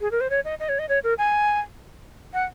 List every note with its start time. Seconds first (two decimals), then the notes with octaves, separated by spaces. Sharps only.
0.01 G#4
0.11 A#4
0.21 C5
0.30 C#5
0.45 D#5
0.60 D#5
0.69 C#5
0.79 D#5
0.89 C#5
1.04 A#4
1.18 G#5
2.34 F#5